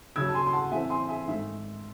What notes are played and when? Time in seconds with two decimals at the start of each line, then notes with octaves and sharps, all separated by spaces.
0.16 D#2 C#3 F#3 C#4 E6 G#6
0.29 A5
0.34 G#5 C6
0.47 C6
0.53 F#5 A5
0.71 A2 E3 C4 E5 G#5
0.90 G#5 C6
1.09 E5 G#5
1.27 G#2 D#3 A3 E5